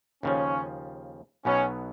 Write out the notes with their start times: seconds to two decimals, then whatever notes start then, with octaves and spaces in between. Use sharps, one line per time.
0.23 D#2 C#3 F3 C#4
1.45 B1 B2 F#3 B3 C#4